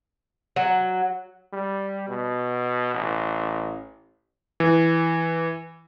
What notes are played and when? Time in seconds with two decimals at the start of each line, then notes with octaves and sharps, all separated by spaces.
0.56 F#3
1.53 G3
2.08 B2
2.94 A1
4.60 E3